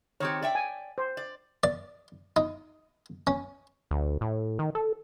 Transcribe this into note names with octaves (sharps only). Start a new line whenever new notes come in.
D#3 C4 G4 C#5
D5 E5 G5
G#5
C5
D5
D5
D#4
C#4
D2
A2
D#3
A4